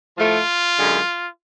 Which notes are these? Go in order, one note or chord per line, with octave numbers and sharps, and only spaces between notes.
A2 F3 A3 F4
F#2 D3 G#3